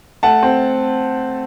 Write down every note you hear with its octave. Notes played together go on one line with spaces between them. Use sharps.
A3 F#5 A5
C4